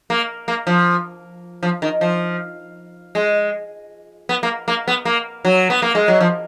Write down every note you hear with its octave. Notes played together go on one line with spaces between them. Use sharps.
A#3
A#3
F3
F3
D#3
F3
G#3
B3
A#3
A#3
B3
A#3
F#3
B3
A#3
G#3
F#3
F3